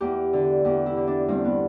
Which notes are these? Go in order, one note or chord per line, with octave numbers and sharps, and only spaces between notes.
E2 G4
D3
E2 G4
E4
D3
D4
G2 C4
B3